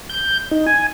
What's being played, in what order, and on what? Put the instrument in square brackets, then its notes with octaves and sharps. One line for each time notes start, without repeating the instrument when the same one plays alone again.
[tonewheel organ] G6
D#4
G#5